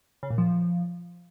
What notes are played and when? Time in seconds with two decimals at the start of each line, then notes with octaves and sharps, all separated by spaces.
0.23 C#3
0.30 A#2
0.38 F3